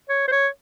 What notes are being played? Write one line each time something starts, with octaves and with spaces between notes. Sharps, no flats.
C#5
C5
C#5